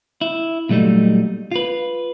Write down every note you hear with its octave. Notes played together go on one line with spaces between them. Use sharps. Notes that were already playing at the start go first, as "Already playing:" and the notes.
E4
A#2 F#3 G3 A3 D#4
F4 B4